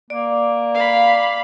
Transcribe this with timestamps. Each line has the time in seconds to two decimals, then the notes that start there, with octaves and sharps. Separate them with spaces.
0.10 A#3 D5
0.74 F5 B5